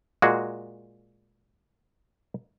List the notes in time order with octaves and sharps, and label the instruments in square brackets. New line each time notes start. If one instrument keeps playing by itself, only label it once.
[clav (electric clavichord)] A#2 G#3 F#4 G#4